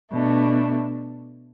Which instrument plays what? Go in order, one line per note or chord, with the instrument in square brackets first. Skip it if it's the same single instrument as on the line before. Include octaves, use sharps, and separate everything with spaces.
[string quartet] B2 A3 D4